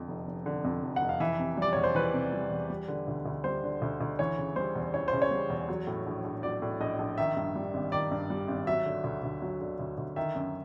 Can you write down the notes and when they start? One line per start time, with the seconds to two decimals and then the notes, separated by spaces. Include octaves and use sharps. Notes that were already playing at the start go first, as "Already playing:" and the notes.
Already playing: F2 D3
0.08 F1
0.27 F1
0.46 D3
0.65 F2
0.83 F1
0.96 F#5
1.02 F1
1.09 F5
1.20 E3 E5
1.39 C3
1.57 G3 D5
1.73 E2 C#5
1.84 C5
1.95 E3 B4
2.13 C3
2.32 G3
2.51 E2
2.70 G3
2.88 D3
3.08 D2
3.26 D2
3.44 G3 C5
3.64 D3
3.82 D2
4.01 D2
4.19 E3 C#5
4.38 C#3
4.56 G3 C5
4.75 E2
4.94 E3 C#5
5.08 C5
5.13 C#3
5.22 C#5
5.31 G3
5.50 E2
5.68 F#3
5.87 A2
6.07 A#1
6.25 A#1
6.43 F#3 D5
6.62 A2
6.81 A#1 D#5
6.99 A#1
7.18 D#3 E5
7.37 G2
7.55 G3
7.74 G#1
7.92 D#3 D5
8.11 G2
8.30 G3
8.48 G#1
8.67 F#3 E5
8.86 D3
9.04 D2
9.23 D2
9.42 F#3
9.61 D3
9.79 D2
9.98 D2
10.16 D#3 E5
10.35 F#2